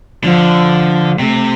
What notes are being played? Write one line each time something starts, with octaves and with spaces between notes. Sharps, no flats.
D3 F3
C3 A3